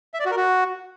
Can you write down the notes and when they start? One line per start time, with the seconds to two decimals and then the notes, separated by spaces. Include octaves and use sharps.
0.14 E5
0.20 D5
0.25 F#4
0.31 A#4
0.37 F#4